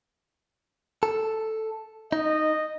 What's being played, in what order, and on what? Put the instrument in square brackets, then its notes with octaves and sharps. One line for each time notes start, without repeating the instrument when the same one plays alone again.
[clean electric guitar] A4
[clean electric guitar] D#4 [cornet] D#5